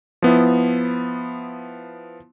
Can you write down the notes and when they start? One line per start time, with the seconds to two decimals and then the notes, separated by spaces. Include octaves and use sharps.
0.22 F3 B3 E4